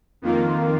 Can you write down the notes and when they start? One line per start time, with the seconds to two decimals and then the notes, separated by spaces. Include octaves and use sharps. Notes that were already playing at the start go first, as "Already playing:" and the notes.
0.22 F2 D#3 A#3 F4